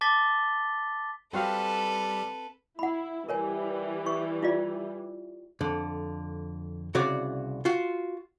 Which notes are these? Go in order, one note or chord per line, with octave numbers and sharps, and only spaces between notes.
A5 D6 A6 B6 G7
G3 C4 F#4 G4 A4 B4 F5
E4 F#5 B5
E3 G3 A#4 C#5 G#5
C#6
E4 F4 D5
F2 D3
C2 C#3 F#4 C#5 D5
F4 F#4